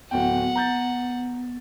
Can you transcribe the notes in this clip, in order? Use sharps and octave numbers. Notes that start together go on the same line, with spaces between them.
D1 B3 F#4 F#5 G5
A#5 G6 A6